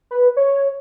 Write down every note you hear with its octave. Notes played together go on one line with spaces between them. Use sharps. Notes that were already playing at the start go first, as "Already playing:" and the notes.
B4
C#5